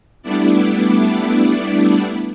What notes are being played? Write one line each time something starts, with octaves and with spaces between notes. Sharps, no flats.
G3 A3 B3 D4 E4 D5